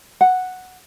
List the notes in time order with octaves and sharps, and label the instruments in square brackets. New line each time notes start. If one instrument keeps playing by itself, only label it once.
[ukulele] F#5